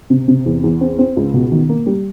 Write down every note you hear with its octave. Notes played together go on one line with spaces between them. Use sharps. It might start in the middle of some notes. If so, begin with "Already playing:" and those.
C3
C3
E2
E2
C4
C4
C#2
B2
D#3
A#3
G3